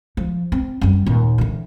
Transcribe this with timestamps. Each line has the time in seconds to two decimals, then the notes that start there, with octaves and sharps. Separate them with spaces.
0.17 F3
0.52 C4
0.81 F#2 G3
1.06 D#2 A#2
1.38 D3 E3